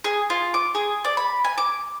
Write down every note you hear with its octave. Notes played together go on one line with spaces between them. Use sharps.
G#4
F4
D6
G#4
D5
B5
G#5
D6